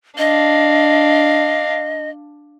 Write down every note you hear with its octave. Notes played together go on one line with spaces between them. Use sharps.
D4 D#5 F5